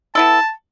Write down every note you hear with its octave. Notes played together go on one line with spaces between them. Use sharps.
B3 E4 A4 A5